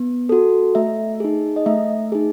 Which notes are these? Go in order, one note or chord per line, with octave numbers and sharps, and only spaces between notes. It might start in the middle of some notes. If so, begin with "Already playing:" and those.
Already playing: B3
F#4 A4
A3 E5
D#4 G#4
D#5
A3 E5
D#4 G#4